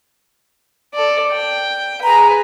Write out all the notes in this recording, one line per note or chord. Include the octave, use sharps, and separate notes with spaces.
A4 D5
G5
G#4 B4 A#5